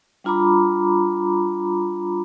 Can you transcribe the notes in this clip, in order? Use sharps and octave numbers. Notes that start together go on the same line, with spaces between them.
G3 D4 F4 A#5 B5 D6